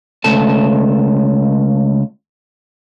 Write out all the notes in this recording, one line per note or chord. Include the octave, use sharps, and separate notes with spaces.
C#2 A3 A5